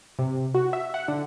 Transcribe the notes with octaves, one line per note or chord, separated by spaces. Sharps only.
C3
F#4
E5
F#5
D3